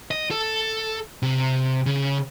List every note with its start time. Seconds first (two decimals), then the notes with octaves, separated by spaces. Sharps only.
0.11 D#5
0.31 A4
1.23 C3
1.86 C#3